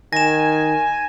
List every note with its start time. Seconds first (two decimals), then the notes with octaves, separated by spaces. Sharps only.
0.13 D#3 G#5 A#6 E7